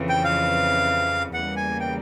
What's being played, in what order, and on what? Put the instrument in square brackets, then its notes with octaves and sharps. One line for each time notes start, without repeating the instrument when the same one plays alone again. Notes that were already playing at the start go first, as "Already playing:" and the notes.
Already playing: [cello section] F2 C#3 E3
[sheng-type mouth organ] G5
F5
[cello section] E2 C#3 E3 G3 A#3 [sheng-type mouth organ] F#5
[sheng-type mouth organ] G#5
G5